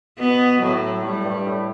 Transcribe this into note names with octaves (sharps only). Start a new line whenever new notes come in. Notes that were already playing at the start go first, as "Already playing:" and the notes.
B2 B3
A2 F#3
A2 G3
G2
A2